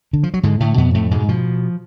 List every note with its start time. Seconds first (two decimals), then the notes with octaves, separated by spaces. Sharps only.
0.13 D3
0.23 F3
0.34 F#3
0.43 G#2 D3 G#3
0.60 A2 D3 A3
0.77 F2 B2 B3
0.94 F2 A2 A3
1.11 G#2 B2 G#3
1.29 B2 F3